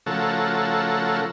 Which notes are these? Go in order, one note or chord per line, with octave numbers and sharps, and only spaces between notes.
C#3 F3 A3 F#4 A4 A#4